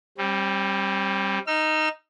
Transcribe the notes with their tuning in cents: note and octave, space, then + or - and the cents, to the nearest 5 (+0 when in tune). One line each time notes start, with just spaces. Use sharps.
G3 +0 C4 +45
D#4 +0 E6 +45